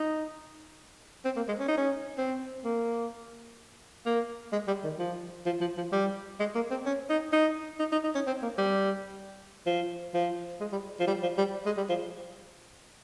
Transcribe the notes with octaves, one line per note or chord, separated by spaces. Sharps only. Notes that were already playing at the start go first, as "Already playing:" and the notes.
Already playing: D#4
C4
A#3
G#3
C#4
D#4
C#4
C4
A#3
A#3
G#3
G3
D#3
F3
F3
F3
F3
G3
G#3
A#3
C4
C#4
D#4
D#4
D#4
D#4
D#4
C#4
C4
A#3
G3
F3
F3
G#3
G3
F3
G3
F3
G3
G#3
G3
F3